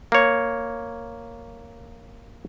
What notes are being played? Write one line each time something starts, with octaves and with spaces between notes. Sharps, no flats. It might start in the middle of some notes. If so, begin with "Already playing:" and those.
A#3 C#5